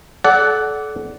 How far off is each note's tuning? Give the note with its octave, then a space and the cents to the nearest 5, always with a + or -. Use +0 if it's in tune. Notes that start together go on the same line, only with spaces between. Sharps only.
A4 -30 D5 -15 F#5 +10